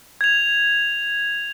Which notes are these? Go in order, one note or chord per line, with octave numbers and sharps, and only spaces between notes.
G#6 F7